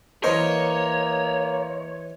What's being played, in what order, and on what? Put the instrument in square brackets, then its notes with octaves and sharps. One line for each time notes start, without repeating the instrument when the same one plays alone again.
[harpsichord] E3 A#4 [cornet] A#3 [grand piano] C5 D#5 [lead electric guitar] C#5